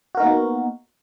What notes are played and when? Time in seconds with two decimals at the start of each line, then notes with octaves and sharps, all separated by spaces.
0.15 F#4
0.17 A#4
0.20 D#4
0.23 A#3
0.25 B3